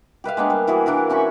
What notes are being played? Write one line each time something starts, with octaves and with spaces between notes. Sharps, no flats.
G4 B4 E5 F5
G#3 A#3 B3 D4
G3
E3 E4 F#4 G#4
E3 D4 E4 A#4
C4 C#4 B5 C#6